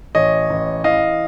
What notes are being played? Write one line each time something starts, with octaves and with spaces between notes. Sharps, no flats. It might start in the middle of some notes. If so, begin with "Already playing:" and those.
A1 C#5 D#5
A1
E3 D#5 F5